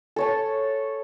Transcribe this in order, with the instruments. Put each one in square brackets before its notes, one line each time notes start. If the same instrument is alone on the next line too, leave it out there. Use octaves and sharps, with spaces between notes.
[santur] A4 C#5 A5